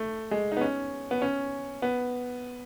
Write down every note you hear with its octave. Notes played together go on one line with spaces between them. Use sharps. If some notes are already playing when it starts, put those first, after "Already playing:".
Already playing: A3
G#3
B3 D#4
C#4
B3
C#4
B3